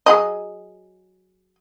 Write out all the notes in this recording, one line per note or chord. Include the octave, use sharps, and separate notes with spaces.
F#3 G#4 D#5